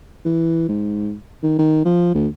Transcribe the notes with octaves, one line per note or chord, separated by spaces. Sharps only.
E3
G#2
D#3
D#3
F3
D2